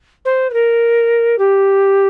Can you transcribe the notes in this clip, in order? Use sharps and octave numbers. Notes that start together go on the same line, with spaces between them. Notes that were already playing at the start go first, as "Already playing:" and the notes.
C5
B4
A#4
G4